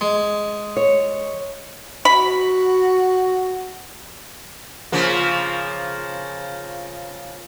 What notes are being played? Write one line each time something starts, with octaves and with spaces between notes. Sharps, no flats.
G#3
C#5
F#4 B5
C#3 F3 A#3